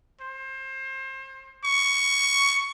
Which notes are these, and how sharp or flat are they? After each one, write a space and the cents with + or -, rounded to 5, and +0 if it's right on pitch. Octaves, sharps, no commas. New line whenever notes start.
C5 +30
C#6 +10